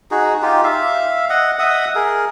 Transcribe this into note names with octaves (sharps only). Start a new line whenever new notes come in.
D#4 F#4 G#4
D#4 F4 G4
E5 F5
D#5 F#5
D#5 E5 F#5 D#6
G#4 A#4